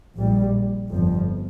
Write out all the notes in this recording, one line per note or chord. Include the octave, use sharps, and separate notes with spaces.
A#1 A#2 G3
G1 F2 F3